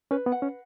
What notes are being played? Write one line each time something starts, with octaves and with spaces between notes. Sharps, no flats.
C#4 B4
B3
F#5
C#4